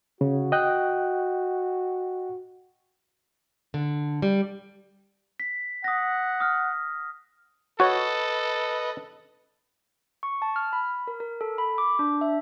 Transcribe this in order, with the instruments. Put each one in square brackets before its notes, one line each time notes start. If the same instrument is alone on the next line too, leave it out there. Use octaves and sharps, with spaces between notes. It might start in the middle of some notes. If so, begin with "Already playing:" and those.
[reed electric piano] C#3 [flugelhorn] F#4
[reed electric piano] D#5 G5 F#6
[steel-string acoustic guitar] D3
G3
[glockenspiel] B6
[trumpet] F#5 [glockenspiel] D#6 A#6
[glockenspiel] D#6 F6
[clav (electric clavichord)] F#4 C#5 [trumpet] A4 [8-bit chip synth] B4 D#5
[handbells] C#6
A5
F6
B5
A#4
A#4
A4
B5
D6
D4
E5